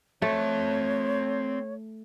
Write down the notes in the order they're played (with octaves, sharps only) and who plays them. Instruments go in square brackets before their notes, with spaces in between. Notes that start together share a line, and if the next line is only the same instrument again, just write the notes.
[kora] A3 [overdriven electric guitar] C4 A5 [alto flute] C#5